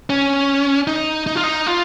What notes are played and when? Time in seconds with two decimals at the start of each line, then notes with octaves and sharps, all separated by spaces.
0.10 C#4
0.87 D#4
1.27 D#4
1.35 F4
1.44 D#4
1.67 F4